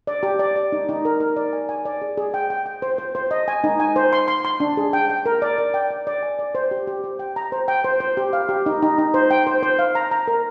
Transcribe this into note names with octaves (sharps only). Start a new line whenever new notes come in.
D5
G4
D5
D5
D#4
D#4
A#4
A#4
D5
G#5
G#5
D5
G#4
G#4
G5
G5
G5
C5
C5
C5
D#5
G#5
D#4
G#5
C5
C6
C6
C6
D4
G#4
G5
G5
A#4
D5
D5
G5
D5
D5
G#5
D5
C5
G4
G4
C5
G5
A#5
C5
G5
C5
C5
G4
F5
G4
D#4
D#4
D#4
C5
G5
C5
C5
F5
A#5
A#5
A#4